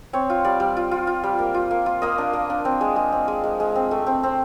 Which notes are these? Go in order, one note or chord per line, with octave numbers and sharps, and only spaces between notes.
C4 C#5
F4
G3 D5
G3
F4
F4
F4
G3
A#3
F4
A#3
F4
A#3 D#5
D4
A#3
D4
C4
G#3
G#3
C4
G#3
G#3
G#3
C4
A3
C4
C4